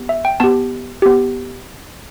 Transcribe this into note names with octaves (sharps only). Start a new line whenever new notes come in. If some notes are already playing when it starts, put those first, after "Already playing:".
Already playing: B3 G4
E5
G5
B3 G4 A5
B3 G4